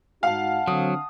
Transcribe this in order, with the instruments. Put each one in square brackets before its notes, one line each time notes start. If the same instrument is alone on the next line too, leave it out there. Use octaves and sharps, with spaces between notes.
[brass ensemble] G#2 D#4 F#4 [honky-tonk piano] F5 [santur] F#5 A5
[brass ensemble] D3 C4 [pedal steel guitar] F#3 [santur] D#6